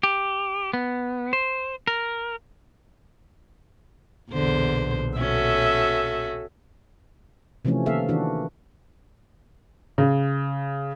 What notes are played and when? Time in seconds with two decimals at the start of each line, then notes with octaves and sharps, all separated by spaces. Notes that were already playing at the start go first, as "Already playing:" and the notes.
0.03 G4
0.73 B3
1.33 C5
1.87 A#4
4.31 B1 E2 A#2 D3 C5
5.18 C#4 F#4 A4 E5
7.65 C3 E3 F3 A3 C#4
7.86 D#3 A#3 A4 E5 F5
8.08 D#3 E3 D4 F#4
9.98 C#3